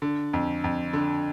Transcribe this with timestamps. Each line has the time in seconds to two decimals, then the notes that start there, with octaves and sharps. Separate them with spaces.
0.02 D3
0.33 F2
0.64 F2
0.93 D3